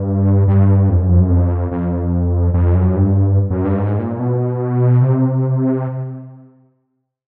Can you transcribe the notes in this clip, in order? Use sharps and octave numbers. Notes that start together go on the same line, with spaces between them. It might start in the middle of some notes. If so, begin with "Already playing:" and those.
Already playing: G2
G2
F2
F#2
F2
F#2
F2
F2
F2
F#2
G2
F#2
G2
G#2
A#2
B2
C3